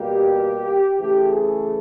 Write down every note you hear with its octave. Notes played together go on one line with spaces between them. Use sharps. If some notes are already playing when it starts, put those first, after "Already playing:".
Already playing: B2 G3 A#3 G4
C#3 E3 A3 G4
G#4